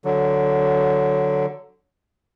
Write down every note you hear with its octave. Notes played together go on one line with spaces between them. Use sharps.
D3 F#3